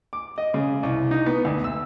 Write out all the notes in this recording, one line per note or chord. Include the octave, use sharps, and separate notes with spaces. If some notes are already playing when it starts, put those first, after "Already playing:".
D6
D#5
C#3
C2
D#4
B3
D2
E6